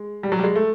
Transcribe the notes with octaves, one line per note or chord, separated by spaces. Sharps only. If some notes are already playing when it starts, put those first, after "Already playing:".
Already playing: G#3
G3
F#3
G3
G#3
A3